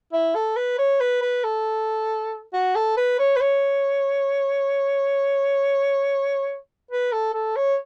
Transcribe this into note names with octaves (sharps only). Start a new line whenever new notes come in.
E4
A4
B4
C#5
B4
B4
A4
F#4
A4
B4
C#5
B4
C#5
B4
A4
A4
C#5